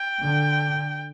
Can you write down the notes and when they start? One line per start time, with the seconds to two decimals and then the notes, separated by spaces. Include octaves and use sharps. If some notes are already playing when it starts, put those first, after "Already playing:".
Already playing: G5
0.22 D3